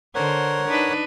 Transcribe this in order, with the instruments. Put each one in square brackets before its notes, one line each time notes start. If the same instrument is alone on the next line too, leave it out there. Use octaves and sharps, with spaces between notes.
[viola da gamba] D3 C5 [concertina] A#4 C#5 F#5
[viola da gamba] D4 D#4 B4